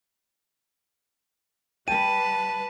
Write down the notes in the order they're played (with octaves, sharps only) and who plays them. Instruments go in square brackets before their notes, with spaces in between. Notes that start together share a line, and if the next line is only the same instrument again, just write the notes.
[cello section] G3 B4 [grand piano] G5 [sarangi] A5 [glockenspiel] D#7